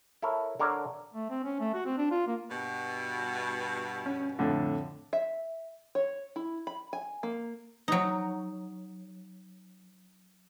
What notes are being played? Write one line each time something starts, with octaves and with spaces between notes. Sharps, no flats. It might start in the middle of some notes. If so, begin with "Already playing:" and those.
E4 A4 A#4 C#5
D3 A#4 C#5 D5 A#5
A3
C4
C#4
A3
F#4
C4
D4
F4
A#3
G2 B2
C#4
F2 A2 D3
E5
C#5
E4
B5
G#5
A#3
F#3 D#4